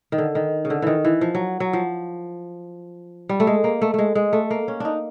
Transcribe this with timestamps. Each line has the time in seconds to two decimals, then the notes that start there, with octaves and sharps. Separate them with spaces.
0.12 D#3
0.18 D3
0.35 D#3
0.65 C#3
0.70 D3
0.82 D#3 E3
1.05 E3
1.21 F3
1.35 F#3
1.60 F#3
1.73 F3
3.29 G3
3.40 A3
3.47 G#3
3.64 A#3
3.82 A3
3.94 G#3 A3
4.15 G#3
4.33 A3
4.51 A#3
4.68 C#4
4.80 D4 D#4